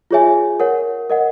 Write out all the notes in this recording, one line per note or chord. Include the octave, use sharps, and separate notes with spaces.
F4 G#4 C#5 E5 G#5
A#4 C#5 F#5
A#4 D#5 F#5